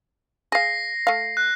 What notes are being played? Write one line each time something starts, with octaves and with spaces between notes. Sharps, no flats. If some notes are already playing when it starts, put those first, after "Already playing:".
G#4 F5 A#6 C7
A3 F5
F#6